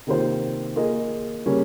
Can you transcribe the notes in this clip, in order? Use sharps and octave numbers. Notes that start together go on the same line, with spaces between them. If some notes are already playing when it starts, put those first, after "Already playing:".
C3 D#3 A#3 F4 C5
A#3 F4 G#4 D#5
C#3 G3 A#3 C#4